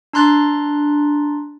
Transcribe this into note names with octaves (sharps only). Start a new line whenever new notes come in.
D4 A#5 C6 F#6 A6